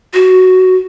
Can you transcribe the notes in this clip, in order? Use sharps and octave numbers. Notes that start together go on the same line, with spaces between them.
F#4